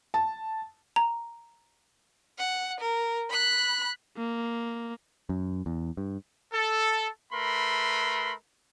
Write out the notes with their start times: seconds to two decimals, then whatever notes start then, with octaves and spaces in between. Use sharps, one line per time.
0.14 A5
0.96 A#5
2.38 F#5
2.80 A#4
3.30 B5 F#6
4.16 A#3
5.29 F#2
5.66 E2
5.97 G2
6.52 A4
7.33 A3 A#4 B4 B5 C6